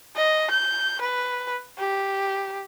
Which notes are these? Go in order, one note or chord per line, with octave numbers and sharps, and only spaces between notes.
D#5
G6
B4
G4